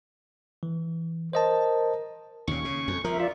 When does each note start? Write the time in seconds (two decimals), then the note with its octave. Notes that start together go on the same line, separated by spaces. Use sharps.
0.63 E3
1.33 A#4 C5 D#5 A5
2.48 D#2 A#2 C#4 C#6
2.65 C#3
2.88 F2
3.04 F3 A#4 E5
3.20 F4 D5 E5